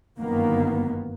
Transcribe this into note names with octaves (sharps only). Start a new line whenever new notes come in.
G1 F#2 D#3 A#3 B3